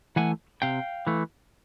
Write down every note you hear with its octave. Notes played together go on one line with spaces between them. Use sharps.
E3 A3 F#5 G#5
C3 F5 G5
E3 A3